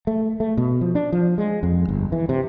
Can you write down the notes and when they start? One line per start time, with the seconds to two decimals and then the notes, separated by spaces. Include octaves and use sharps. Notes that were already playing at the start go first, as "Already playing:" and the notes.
0.07 A3
0.40 A3
0.57 B2
0.81 F3
0.95 D4
1.12 F3
1.38 G#3
1.63 F2
1.89 G1
2.12 E3
2.29 C3